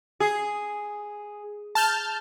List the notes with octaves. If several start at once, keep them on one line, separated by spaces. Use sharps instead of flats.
G#4
A5 F6 G6